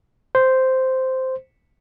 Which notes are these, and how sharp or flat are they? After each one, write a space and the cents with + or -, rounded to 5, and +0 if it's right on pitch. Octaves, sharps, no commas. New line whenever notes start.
C5 -5